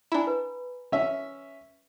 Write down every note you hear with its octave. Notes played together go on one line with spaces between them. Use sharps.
D4 E4 G#5 A#5 B5
B4
C#4 E5